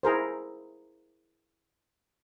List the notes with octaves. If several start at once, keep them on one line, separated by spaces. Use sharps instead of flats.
E4 G#4 A#4 C5